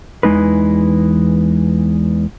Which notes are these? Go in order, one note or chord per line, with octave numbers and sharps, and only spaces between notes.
E2 E3 G#3 D#4 B4